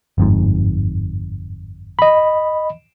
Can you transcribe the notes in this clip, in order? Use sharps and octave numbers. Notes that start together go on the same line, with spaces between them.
G1 F2 G#2
D#5 B5